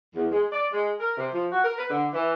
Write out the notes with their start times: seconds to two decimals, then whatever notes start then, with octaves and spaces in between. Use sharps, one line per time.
0.15 E2
0.32 G#3
0.52 D5
0.72 G#3
1.00 A#4
1.17 C3
1.34 F3
1.52 F#4
1.64 A#4
1.78 B4
1.90 D3
2.13 E3